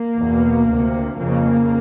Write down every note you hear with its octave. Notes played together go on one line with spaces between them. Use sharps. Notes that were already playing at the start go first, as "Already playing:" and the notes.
Already playing: A#3
E2 B2
D2 C3
F2 C#3 A#3